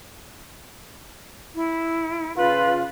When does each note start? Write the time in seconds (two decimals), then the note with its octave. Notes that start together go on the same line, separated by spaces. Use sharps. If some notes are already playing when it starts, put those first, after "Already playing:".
1.55 E4
2.37 C#3 F4 B4